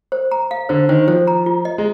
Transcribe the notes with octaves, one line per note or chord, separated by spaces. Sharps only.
C5
A#5
F5
D3 C5
D#3 C5
F3 C5
A#5
F4
D#5
G#3